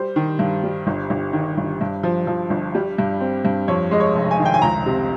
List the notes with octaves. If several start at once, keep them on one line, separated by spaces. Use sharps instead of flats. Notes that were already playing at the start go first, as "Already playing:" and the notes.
Already playing: G3 C5
D#3
G2
G3
G1
G1
D#3
G1
G2
F3
F3
G1
G3
G2
C4
G2
F2 C#5
G#3 D#5
C#5
F1
G#5
D#3
G5
G#5
C#2 A#5
C3